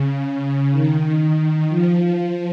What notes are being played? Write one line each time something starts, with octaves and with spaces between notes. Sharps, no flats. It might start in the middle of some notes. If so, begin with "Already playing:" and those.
Already playing: C#3
C#3
D#3
F3